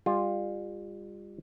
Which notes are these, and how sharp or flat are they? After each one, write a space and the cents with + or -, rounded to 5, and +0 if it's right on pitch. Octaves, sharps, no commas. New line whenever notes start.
G3 +30 F4 +0